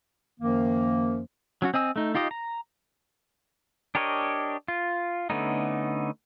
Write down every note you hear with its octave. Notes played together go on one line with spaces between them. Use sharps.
F#2 D#3 F3 A#3
F#3 C#4 F#4
C4 D#5 G#5 E6
A3 D#4
D#4 F4 G4 D#5
A#5
D4 G4 A#4 C#5 D#5
F4
D3 A3 B3 C#4 D#4